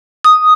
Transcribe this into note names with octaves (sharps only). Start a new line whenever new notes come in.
D#6